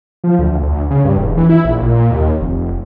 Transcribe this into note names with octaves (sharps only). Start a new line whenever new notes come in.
F3
D2
D2
C#3
G2
E1
E3
E4
A#1
A#2
D#2
F1